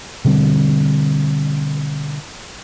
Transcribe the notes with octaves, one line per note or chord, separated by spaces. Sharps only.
B2 D3 G3 C4